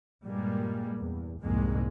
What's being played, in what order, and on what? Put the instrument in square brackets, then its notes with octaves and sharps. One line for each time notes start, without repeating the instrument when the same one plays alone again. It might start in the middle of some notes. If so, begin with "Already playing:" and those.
[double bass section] G2 A#2 G3 G#3 A#3
E2
C2 F2 G#2 G#3 A#3